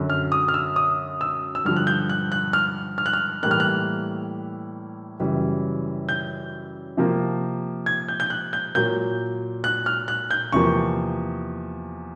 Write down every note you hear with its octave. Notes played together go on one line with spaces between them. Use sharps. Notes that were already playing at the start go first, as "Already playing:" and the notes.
Already playing: F#2 D3 F#3
F6
D#6
F6
E6
D#6
E6
E6
G2 D3 F3 F6
F#6
G6
F#6
F#6
F6
F6
F#6
F6
A2 E3 G3 A#3 F#6
F6
F#6
F#2 C#3 E3 G3
G6
C3 F3 A#3
G#6
G6
G6
F#6
G6
A#2 F#3 A#3 G6
F#6
F6
F#6
G6
E2 C3 F3 A#3 C#6